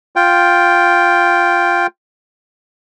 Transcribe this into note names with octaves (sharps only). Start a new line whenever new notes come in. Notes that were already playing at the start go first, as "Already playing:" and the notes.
F4 G5